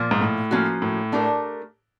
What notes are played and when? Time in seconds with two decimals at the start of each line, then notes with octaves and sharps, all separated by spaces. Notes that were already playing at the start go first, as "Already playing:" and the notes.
Already playing: A#2 F3 A#3
0.11 G#2
0.21 A2
0.51 F3 A#3 C#4 F#4
0.82 A2
1.12 A3 D4 G4 A#4